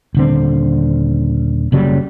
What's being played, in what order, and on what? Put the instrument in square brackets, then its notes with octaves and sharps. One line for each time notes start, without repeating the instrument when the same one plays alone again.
[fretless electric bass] D#1 D3 C4
F#1 C#3 F#3 G3